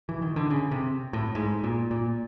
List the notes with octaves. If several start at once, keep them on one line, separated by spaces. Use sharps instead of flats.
E3
D#3
D3
C#3
C3
A2
G#2
A#2
A#2